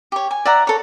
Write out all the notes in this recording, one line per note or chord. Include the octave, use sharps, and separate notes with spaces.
G4 C#5
G#5
D5 E5 F#5 A#5
A4 C#5